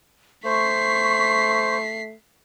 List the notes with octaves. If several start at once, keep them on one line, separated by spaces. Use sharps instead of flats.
A3 C5 C#6 B6 C7